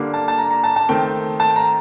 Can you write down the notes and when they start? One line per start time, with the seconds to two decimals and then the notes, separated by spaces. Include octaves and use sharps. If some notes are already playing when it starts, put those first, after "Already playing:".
Already playing: D3 G3 A#3
0.14 A5
0.28 A5
0.38 A#5
0.51 A#5
0.64 A5
0.76 A5
0.89 D#3 A3 C4 G5
1.40 A5
1.56 A#5